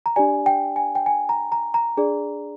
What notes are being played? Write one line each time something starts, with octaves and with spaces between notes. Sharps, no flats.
A#5
D4 G4 D5 G#5
G5
G#5
G5
G#5
A#5
A#5
A#5
D4 G#4 D5